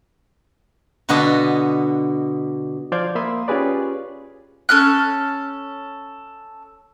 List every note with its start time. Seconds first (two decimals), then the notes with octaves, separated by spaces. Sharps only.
1.09 B2 D3 F#4 B4 D#5 A5
2.92 F3 C5 D5 F5 G6 G#6
3.15 A#3 E5 F5 B5 C6 D#6
3.48 C#4 F4 G4 G#4 B4 D5
4.69 C#4 A4 F6 F#6